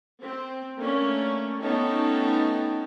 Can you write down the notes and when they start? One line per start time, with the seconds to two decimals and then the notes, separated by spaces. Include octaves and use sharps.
0.22 C4
0.78 A3 A#3 C#4 D4
1.60 A3 B3 C#4 D#4 G5 A5